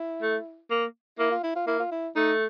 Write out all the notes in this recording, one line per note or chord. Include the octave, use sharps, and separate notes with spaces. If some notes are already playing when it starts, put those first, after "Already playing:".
Already playing: E4
A3
A#3
A#3 E4
F4
E4
F4
A#3 E4
F4
E4
A3 D#4